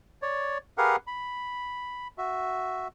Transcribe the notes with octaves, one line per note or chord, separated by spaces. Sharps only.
C#5 D5
G4 G#4 A#4 B4 F5 F#5
B5
F#4 E5